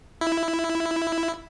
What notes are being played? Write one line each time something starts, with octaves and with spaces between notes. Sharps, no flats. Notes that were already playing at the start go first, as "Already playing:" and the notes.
E4